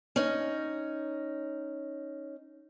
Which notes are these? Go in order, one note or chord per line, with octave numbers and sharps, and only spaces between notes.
C#4 D#4